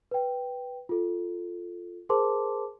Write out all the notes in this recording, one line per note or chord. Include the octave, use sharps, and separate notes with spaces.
B4 G5
F4 A4
G#4 A#4 C5 A5 C6 D6